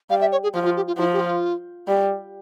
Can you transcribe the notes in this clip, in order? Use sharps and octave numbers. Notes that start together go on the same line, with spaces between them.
G3 F5
E5
C#5
G#4
F3 F4
F4
G4
F4
F3 E4
G4
F4
G3